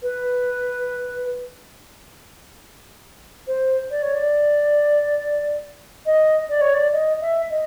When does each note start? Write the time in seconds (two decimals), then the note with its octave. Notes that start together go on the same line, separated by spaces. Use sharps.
0.02 B4
3.47 C5
3.91 D5
4.03 C#5
4.14 D5
6.06 D#5
6.49 D5
6.61 C#5
6.74 D5
6.92 D#5
7.21 E5
7.50 D#5